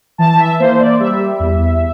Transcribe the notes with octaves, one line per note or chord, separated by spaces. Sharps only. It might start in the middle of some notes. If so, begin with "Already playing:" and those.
E3 A5
E5
A#3 C5
D5
G3 E5
E2